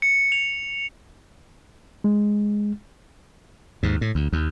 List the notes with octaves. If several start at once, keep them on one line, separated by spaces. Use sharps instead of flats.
C#7
F7
G#3
D#2 G#2
A2
D2
D#2